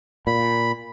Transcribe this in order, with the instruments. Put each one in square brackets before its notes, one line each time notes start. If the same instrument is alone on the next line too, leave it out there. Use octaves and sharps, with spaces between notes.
[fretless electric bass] A#2 [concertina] B5